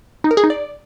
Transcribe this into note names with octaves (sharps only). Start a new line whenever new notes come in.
D#4
A#4
G#4
D#4
D5